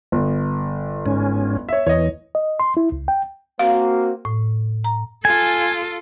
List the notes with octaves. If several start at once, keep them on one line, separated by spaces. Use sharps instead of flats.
G1
G#2 C#4
C#5 E5
E2 E3 C#5 D#5
D#5
C6
E4
C#2
G5
A#3 C4 F#4 F5
A2
A#5
F4 A4 G#5